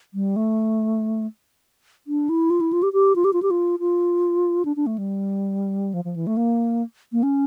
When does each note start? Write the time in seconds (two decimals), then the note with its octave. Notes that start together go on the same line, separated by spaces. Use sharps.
0.14 G3
0.36 A3
2.07 D4
2.29 E4
2.50 F4
2.61 E4
2.73 F4
2.83 G4
2.93 G4
3.15 F4
3.24 G4
3.33 F4
3.42 G4
3.50 F4
3.80 F4
4.65 D4
4.76 D4
4.86 A3
4.98 G3
5.94 F3
6.04 F3
6.16 E3
6.27 A3
6.37 A#3
7.12 A#3
7.23 C#4